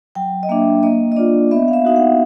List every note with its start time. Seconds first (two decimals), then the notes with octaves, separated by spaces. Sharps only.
0.15 F#3 G5
0.43 D#5
0.49 A#3 D4 E5
0.83 A#3 D#5
1.12 D#5
1.16 D4 F4 D5
1.51 B3 E5
1.68 F5
1.73 E5
1.85 D#4 F#4 F5
1.96 F#5